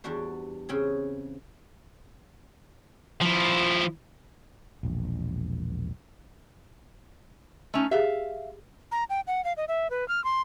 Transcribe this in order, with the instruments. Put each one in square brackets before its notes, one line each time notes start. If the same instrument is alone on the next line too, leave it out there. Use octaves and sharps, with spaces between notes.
[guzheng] E2 G3 D4 F#4 C5
C#3 C4 G#4
[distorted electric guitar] F3 E4
[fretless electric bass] E1 A#1
[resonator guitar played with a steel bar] A3 C#4 D#4
[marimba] G4 G#4 [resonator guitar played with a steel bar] E5 F5
[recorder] A#5
G5
F#5
F5
D#5
E5
B4
F6
C6